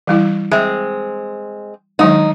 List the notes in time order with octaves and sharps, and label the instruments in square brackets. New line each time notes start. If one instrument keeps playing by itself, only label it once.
[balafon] E3 G3 E4
[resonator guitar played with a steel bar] G#3 C4 [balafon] E5
[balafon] D#3 F#3 G#3 [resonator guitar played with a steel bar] D#4